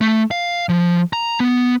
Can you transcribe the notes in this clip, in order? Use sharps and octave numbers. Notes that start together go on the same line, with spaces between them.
A3
F5
F3
A#5
B3